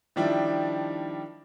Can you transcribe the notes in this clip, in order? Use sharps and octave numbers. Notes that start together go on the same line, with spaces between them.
D#3 F3 G3 D4 E4